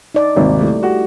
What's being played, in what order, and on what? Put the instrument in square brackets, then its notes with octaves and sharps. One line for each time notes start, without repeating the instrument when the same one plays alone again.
[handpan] D#4 D5
[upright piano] D#1 G#1 C3
[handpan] G3 A3 E4
[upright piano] F#4 G4